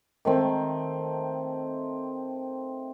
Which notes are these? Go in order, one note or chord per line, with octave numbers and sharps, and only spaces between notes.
D#3 A3 C4